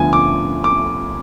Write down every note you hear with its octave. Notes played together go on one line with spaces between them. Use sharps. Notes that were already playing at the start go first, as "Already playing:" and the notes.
Already playing: D2 D3 F3 B3 G#5
D6
D6